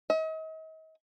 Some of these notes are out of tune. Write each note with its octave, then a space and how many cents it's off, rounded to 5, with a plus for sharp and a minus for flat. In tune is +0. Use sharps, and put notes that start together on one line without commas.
D#5 +40